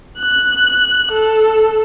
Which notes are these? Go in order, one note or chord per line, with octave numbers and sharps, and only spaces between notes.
F#6
A4